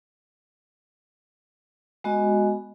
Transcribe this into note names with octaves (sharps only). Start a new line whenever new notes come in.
G#3 B3 F#4 D#5